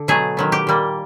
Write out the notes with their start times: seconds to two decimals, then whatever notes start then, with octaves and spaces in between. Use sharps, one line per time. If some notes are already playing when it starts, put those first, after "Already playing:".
Already playing: D3
0.08 B2 F#3 A3 G#4
0.37 D#3 F#3 B3
0.52 G4
0.67 A#2 G3 A#3